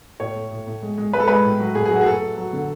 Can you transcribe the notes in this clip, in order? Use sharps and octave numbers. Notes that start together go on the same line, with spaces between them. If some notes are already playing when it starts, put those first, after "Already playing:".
A2 C#5
A3
A2
A2
G#3
G#3
G#3 B4
A4
G#3 B4
A2
F#3
A2 G#4
G#4
F#3
F#4
G#4
A3 A4
A3
F#3
D3